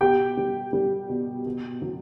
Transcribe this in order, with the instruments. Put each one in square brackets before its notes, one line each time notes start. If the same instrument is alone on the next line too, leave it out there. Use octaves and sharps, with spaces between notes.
[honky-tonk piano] B2 G4 G5
G3
G3
B2
B2
F#3